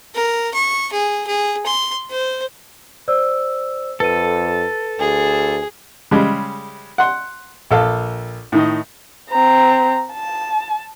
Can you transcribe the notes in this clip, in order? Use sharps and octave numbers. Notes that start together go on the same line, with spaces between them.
A#4
C#6
G#4
G#4
C6
C5
C5 D5 E6
F2 A4 B4 D#7
D2 G#4
C#3 G3 G#3
F#5 C6
A#1 A4 F5
A2 D#3 D#5
C4 A#5
A5